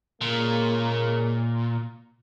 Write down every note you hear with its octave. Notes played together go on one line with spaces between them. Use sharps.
A#2 C#3 G#3 A#3